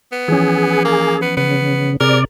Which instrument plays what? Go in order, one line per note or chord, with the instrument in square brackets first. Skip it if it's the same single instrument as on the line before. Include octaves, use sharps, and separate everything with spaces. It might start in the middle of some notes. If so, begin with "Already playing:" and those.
[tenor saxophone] B3
[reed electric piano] E3 F3 C#4 [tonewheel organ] G#4
[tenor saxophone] A#3
B3
[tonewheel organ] C#3 [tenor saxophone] B3
[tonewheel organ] C3 D5 [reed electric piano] G#4 [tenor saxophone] A#4